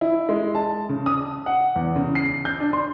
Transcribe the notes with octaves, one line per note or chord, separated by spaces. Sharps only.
E4
G#3
A5
C#3
D#6
F#5
E2
C#3
C7
G6
D4
C6